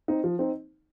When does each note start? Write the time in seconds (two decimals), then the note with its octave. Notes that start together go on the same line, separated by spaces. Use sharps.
0.08 C4 D#4
0.24 F3
0.39 C4 D#4